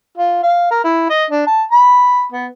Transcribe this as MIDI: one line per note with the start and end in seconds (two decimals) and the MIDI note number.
0.18 0.40 65
0.43 0.71 77
0.71 0.80 70
0.84 1.08 64
1.10 1.25 75
1.30 1.44 62
1.47 1.64 81
1.71 2.24 83
2.32 2.46 59